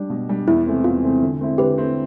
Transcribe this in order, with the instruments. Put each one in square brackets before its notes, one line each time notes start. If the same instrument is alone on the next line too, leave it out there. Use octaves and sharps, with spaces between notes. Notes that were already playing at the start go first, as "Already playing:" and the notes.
Already playing: [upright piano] G3 D4
B2
G3 D4
[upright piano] E2 [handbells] E4
[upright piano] C3 E3 A3 C4
[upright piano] E2 [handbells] F4
[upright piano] C3 E3 A3 C4
D3
A3 C4 E4
[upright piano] D3 [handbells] G4 B4
[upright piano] A3 C4 E4